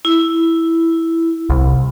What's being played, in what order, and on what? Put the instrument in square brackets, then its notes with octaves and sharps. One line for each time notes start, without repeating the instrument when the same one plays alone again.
[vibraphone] E4
[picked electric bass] C2